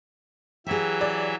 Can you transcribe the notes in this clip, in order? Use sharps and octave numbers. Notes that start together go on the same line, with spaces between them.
E3 F#3 G4 G#4 E5
D5